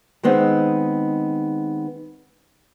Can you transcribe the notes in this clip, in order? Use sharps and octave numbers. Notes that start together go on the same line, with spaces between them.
D#3 G#3 B3 C4 D#4